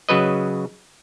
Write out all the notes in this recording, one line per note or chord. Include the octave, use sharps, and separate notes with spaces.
C#3 F#3 B4 D#5